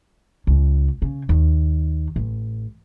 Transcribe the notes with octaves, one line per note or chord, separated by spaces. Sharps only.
C#2
C#3
D#2
A1